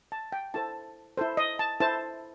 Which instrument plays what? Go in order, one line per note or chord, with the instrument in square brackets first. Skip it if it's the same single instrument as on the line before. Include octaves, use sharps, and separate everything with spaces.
[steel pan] A5
G5
E4 A4 C5 A5
E4 A4 C5
D#5
A5
E4 A4 C5 A5